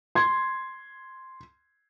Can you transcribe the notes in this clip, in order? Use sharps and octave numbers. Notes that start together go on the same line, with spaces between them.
C6 G#6